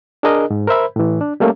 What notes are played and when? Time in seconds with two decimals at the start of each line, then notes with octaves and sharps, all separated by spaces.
0.23 D4 G#4 A#4 D#5
0.51 G#2
0.67 A#4 C5 E5 B5
0.96 A2 E3
1.21 D4
1.40 G3 A3 A#3 C#4